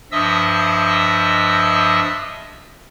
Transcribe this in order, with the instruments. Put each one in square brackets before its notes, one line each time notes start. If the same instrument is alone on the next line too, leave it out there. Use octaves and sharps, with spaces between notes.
[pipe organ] G2 F3 D#5 E5 D#6 E6